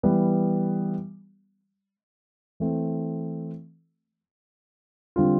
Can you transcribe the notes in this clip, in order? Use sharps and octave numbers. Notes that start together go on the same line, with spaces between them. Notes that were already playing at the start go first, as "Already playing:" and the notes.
E3 G3 B3
E3 A3 C4
D3 G3 C4 F4